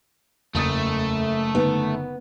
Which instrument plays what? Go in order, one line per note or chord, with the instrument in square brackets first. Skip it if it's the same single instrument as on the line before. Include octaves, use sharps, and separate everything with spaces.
[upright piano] F#1 D#6 A6 [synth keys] E2 [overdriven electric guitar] A3
[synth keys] D3 D#4 [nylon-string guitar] B3